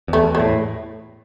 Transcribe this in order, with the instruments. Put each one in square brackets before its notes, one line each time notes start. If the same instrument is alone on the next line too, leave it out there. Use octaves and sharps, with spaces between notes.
[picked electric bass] E2 [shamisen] A3
[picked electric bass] E2
[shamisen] A3
[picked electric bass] A2